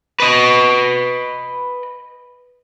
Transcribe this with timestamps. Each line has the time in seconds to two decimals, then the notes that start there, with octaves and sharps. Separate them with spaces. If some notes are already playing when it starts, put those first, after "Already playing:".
0.20 B4 D#5